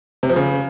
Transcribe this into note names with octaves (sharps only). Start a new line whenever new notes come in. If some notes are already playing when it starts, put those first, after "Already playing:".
C3
F3
C#3